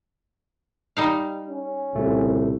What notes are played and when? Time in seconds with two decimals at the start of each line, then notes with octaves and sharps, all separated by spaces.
0.97 G3 D#4 F5
1.49 C#4
1.95 C2 A#2 C#3 A3